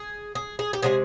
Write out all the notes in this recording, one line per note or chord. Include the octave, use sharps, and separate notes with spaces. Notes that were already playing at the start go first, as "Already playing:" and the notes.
Already playing: G#4
G#4
G#4
G4
C3 F3 G#3 G#4